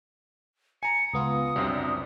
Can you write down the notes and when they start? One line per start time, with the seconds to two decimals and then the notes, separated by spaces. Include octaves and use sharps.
0.83 G#5 A#5 C#7
1.14 C#2 B3 F4 D#6
1.56 C2 F#2 G3 C4 D4